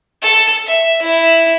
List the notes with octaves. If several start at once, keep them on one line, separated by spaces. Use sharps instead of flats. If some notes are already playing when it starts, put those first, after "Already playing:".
A4
E5
E4